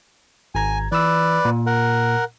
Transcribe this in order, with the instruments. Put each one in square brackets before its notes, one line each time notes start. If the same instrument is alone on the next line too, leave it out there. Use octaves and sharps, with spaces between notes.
[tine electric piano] G#1 A#5 G#6 [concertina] G#5
[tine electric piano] E3 E6 [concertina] B4 D5
[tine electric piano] A#2
[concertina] A#4 F#5